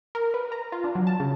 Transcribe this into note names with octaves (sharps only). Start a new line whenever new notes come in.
A#4
B4
A#5
F4
D4
F#3
A5
C#3